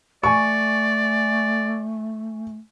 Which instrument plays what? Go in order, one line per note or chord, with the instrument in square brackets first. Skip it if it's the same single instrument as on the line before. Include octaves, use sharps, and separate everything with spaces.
[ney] A3 [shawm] D5 [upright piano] G#5 C#6